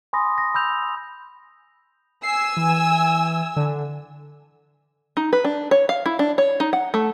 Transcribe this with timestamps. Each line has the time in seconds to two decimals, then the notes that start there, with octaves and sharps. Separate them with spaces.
0.13 G#5 B5 C6 D#6 A#6
0.38 A#6
0.54 B5 E6 G6 F7
2.23 G#5 E6 C7
2.57 E3
3.56 D3
5.17 D#4
5.33 B4
5.45 D4
5.71 C#5
5.89 F5
6.06 E4
6.19 D4
6.38 C#5
6.60 D#4
6.73 F#5
6.94 A3